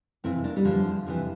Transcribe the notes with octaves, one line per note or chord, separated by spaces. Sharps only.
F2 C3 E3 C4 E4
A#3 D4
G3
E2 D3 F3
F2 C3 E3